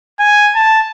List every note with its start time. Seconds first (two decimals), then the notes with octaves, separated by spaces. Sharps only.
0.19 G#5
0.55 A5